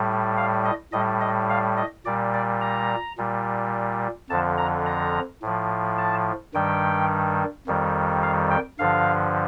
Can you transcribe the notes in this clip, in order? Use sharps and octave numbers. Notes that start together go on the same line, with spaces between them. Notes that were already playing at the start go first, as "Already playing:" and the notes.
Already playing: A2 G3
F5
D#5
A2 G3 D#5
D#5
F5
D#5
A#2 G3 D5
D5
A#5
A#2 G3
F2 D3 F3 A5
A#5
A#5
A2 F3
A5
G2 D#3 G3 G5
F2 D#3 G3
F5
G5
G2 D3 F3 F5